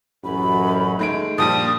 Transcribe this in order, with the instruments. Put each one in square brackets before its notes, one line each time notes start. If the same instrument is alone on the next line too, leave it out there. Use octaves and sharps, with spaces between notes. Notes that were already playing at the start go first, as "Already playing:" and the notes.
[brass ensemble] A1 F#2 [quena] B5
[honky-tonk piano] D#3 G#3 D7 [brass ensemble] A3
[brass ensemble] A#1 [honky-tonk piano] A#2 F3 G3 [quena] A5 [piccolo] D#6